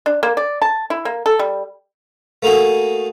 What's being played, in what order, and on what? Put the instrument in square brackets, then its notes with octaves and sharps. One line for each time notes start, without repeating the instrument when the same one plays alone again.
[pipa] D4
A#3
D5
A5
E4
A#3
A4
G3
[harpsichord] A3 A#3 D#4 F#4 G#4